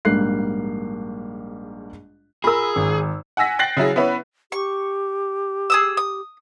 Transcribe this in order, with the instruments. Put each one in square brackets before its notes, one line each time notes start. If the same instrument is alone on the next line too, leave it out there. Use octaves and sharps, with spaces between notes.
[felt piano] A#1 G#2 G3 A#3 F#6 C7
[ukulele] F4 A#4 [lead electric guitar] G#4 [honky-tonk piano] B5 E6
[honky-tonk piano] G#1
F#5 G#5 E6 A#6 B6
G5 F#6 A6 A#6 C7 F#7
C#3 F#3 E4 G#4
B3 C#4 E4 B4 C#5
[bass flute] G4 [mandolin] C#6
[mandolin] G#4 D#6 E6
D#6